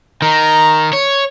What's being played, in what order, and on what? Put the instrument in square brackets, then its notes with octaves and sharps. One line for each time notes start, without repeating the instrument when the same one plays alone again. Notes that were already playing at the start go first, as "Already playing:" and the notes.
[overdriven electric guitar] D#3 [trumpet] A#5
[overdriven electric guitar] C#5